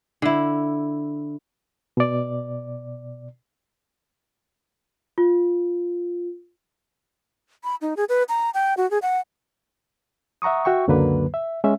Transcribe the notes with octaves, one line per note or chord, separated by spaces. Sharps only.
D3 E4
B2 D5
F4
B5
D#4
G#4
B4
A#5
G5
F#4
G#4
F#5
E5 F#5 A#5 C#6 D#6
F#4 E5 G5 C#6
C#2 F#2 D3 F#3 A#3 B4
E5
G#3 C#4 E5